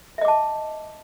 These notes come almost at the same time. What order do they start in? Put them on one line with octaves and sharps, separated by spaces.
E5 D#5 D6 A5